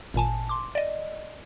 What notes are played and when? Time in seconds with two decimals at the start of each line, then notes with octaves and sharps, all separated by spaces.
0.14 G#1 A#2 G#5 A5
0.49 C6 D6
0.75 D5 D#5